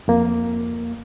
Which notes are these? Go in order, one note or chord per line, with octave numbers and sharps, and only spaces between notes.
F2 A#3